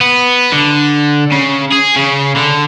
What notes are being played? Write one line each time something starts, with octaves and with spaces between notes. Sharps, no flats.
B3
D3
C#3
G#4
C#3
D3